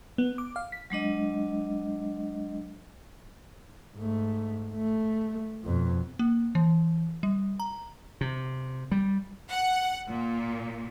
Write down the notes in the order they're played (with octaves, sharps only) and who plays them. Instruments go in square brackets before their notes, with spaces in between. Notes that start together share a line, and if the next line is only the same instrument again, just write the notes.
[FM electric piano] B3
D6
F5
B6
[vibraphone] F#3 G#3 D4 D#5
[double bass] G#2 A3
A3
F2 B2
[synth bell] A#3
E3
G3
A#5
[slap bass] C3
G3
[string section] F#5
A#2